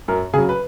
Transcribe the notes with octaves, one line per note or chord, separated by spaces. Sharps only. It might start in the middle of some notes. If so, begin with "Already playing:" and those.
F#2 A#4
C#3 F#3 G#4
B4